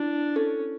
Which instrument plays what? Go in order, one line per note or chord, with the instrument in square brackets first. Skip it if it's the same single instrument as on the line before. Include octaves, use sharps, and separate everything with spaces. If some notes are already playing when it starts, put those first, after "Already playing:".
Already playing: [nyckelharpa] D4 [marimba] E4
[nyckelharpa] C#4 [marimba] A4